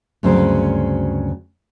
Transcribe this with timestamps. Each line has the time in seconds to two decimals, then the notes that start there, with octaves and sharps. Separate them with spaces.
0.23 D2 G2 C#3 F#3 C4 C5